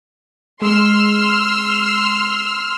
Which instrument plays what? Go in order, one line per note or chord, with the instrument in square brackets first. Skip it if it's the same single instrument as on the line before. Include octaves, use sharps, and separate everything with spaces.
[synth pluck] G#3 [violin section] C6 E6 F6